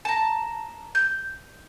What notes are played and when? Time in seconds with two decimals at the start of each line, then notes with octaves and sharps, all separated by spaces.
0.05 A5 A#5
0.95 G6